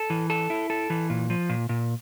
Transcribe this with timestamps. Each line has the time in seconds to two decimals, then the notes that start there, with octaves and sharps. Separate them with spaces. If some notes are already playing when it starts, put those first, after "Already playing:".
Already playing: A4
0.10 E3
0.30 A4
0.50 E4
0.70 A4
0.90 E3
1.10 A#2
1.30 F3
1.49 A#2
1.69 A#2